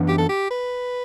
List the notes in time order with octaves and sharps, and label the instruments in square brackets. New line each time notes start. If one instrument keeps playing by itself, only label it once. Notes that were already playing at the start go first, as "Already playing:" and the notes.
Already playing: [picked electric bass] F#2 E3 B3 D4
[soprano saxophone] G4
A4
G4
B4